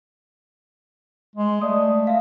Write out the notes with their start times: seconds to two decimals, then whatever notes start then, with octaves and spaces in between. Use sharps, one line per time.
1.36 G#3
1.61 A3 D5 D#6
2.07 E5 F5